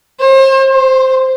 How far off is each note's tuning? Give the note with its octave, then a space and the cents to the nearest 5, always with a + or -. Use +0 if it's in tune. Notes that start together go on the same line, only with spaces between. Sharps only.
C5 +35
C5 +0